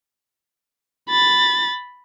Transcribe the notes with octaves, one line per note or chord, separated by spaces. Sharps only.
B5 A6